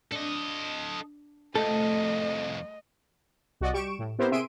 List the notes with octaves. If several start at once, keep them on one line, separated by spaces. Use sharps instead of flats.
D4 A4 D#5
C2 F2 A3 A4 D#5
C2 F#4 D5 D#5
G3 G4 C#6 D7 E7
A2
B3 C4 E4 G4 A#4 C5
C3 G#4 E5 C6 D7 D#7